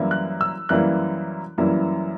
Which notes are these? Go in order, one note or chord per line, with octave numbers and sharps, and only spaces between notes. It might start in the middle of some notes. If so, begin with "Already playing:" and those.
Already playing: F#2 E3 G3 A#3 E4
F#6
E6
F#2 E3 G3 A#3 E4 F#6
F#2 E3 G3 A#3 E4